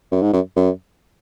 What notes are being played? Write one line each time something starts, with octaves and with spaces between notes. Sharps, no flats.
F#2
G#2
F#2
F#2